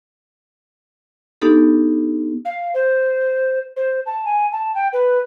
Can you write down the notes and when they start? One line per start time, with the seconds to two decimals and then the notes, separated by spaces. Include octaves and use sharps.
1.42 B3 D4 D#4 G4 A4
2.45 F5
2.74 C5
3.77 C5
4.06 A5
4.25 G#5
4.52 A5
4.75 G5
4.93 B4